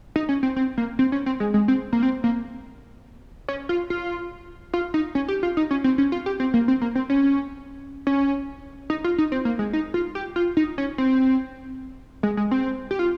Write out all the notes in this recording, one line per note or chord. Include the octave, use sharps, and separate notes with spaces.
D#4
C#4
C4
C4
A#3
C4
C#4
C4
G#3
G#3
C4
A#3
C4
A#3
C#4
F4
F4
F4
D#4
C#4
G4
F4
D#4
C#4
C4
C#4
F4
G4
C4
A#3
C4
A#3
C4
C#4
C#4
D#4
F4
D#4
C4
A#3
G#3
D#4
F4
G4
F4
D#4
C#4
C4
G#3
G#3
C4
G4
F4